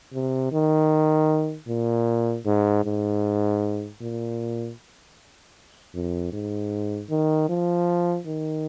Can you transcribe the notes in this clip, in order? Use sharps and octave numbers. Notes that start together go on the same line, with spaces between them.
C3
D#3
A#2
G#2
G#2
A#2
F2
G#2
D#3
F3
D#3